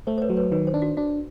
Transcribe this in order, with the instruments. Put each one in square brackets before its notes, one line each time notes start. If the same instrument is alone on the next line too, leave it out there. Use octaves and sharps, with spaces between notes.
[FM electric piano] A3 [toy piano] C5
[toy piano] C5
B4 C#5
[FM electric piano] F#3
[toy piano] B4 C#5
[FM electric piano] D#3 [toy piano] B4 C#5
[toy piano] C5
[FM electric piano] D4
[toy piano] F#4
[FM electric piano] D4 [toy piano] F#4